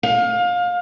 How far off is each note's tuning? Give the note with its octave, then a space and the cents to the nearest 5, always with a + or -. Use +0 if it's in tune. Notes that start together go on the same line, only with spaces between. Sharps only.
F5 +25